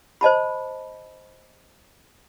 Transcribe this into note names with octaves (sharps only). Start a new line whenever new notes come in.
C5 D#5 A5 B5